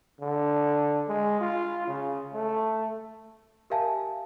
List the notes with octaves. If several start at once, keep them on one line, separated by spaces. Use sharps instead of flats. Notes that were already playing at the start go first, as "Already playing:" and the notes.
D3
G#3
F4
C#3
A3
G4 A#4 E5 F5 G#5 A5